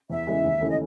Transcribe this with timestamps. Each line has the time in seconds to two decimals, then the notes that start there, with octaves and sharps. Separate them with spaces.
0.10 E2 E5
0.27 C#3 E3 G#3
0.44 D#2
0.61 C#3 E3 A3 C#4
0.69 D#5